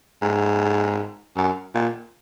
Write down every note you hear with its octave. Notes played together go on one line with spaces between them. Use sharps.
G#2
F#2
A#2